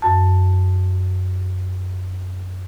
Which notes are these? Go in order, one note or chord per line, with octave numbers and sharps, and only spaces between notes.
F#2 A5